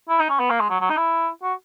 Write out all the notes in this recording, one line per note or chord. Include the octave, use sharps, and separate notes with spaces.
E4
D#4
C#4
B3
A#3
G#3
F#3
F#3
D#4
E4
F#4